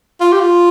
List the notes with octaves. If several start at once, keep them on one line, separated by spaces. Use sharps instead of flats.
F4
G4
F4